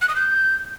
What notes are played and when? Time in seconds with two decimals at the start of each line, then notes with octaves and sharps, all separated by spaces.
0.02 F#6
0.09 D#6
0.16 G6